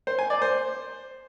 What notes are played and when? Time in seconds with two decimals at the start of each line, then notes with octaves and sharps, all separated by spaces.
0.07 C5
0.19 G#5
0.30 D5
0.42 C5